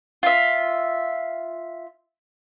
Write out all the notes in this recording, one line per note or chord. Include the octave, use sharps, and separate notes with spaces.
F4 E5